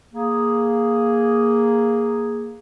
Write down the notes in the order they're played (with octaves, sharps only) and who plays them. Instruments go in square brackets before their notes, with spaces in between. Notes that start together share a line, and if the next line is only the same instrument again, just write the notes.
[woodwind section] A#3 G#4